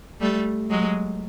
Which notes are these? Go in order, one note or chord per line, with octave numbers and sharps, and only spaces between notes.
G3 A3
F#3 G#3